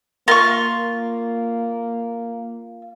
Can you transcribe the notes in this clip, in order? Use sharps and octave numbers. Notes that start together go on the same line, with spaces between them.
A#3 F4 A#4 C#6